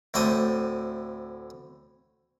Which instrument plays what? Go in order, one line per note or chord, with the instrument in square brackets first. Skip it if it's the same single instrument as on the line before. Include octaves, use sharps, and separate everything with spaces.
[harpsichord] D2 A2 C4 A5 D6 D#6